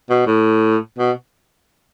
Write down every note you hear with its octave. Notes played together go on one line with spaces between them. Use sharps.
B2
A2
B2